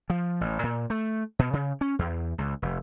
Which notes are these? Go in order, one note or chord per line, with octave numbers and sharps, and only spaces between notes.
F3
A1
A#2
A3
B2
C#3
C#4
E2
C#2
F1